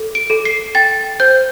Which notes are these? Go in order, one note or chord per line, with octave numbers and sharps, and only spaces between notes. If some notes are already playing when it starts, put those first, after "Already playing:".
Already playing: A4
D7
A4
C7
G5 A6
C5 G6